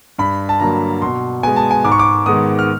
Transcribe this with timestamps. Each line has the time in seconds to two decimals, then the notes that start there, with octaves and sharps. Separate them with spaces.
0.19 G2 B5
0.49 A5
0.60 D3 F#3 A#3 A#5
1.02 B2 C6
1.43 G#3 B3 G#5
1.56 A5
1.71 G#5
1.85 G#2 D6
1.92 C#6
1.99 D6
2.26 D#3 G#3 B3 D#6
2.59 F6